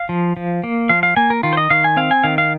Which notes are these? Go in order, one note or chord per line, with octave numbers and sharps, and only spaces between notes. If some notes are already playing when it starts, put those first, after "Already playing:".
Already playing: F5
F3
F3
A#3
F3 F5
F5
A#3 G#5
A#4
D#3 F4
C5
D#5
D#3 F5
G#5
C4 F5
G#5
D#3 F5
F5